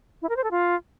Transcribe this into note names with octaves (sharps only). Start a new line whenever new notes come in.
E4
A#4
C5
A4
F4